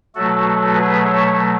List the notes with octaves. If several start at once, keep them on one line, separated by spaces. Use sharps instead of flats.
B2 F#3 A3 F#4 A4
G#4 B4
C#5 E5